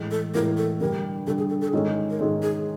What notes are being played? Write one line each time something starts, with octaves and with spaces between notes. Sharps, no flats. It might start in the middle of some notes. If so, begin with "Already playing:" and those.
Already playing: A2 E3 G#3
A4
A2 E3 G#3 A#4
A4
G2 D3 G3 A#4
G2 D3 G3 A4
G#4
A4
A4
G#4
G#2 D#3 G#3 C#4 A4
A#4
G#2 D#3 G#3 C#4 A4
G#4